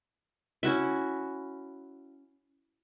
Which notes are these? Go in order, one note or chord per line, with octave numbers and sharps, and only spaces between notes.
C#4 E4 F#4 E5